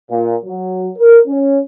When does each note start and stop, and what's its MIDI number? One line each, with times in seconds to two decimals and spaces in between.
0.10 0.34 46
0.45 0.89 54
0.97 1.20 70
1.27 1.58 61